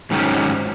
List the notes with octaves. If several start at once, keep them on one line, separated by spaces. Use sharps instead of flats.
G#2 D#3 F#3 C#4